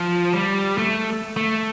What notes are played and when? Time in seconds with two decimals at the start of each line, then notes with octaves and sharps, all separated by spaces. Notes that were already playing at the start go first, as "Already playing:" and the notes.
Already playing: F3
0.33 G3
0.78 A3
1.37 A3